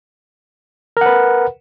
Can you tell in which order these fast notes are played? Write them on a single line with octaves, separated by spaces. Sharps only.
A#4 F#5 B4